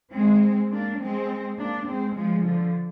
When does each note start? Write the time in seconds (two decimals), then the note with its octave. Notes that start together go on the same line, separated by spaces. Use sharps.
0.14 G#3 C4
0.71 A#3 D4
1.00 G#3 C4
1.57 A#3 D4
1.86 G#3 C4
2.15 F3 G#3
2.43 D3 F3